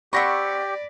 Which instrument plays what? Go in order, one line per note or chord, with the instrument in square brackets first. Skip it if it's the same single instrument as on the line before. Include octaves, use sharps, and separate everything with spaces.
[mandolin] C4 F#5 C#6 [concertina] G4 [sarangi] D5 [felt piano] B5 A#6 B6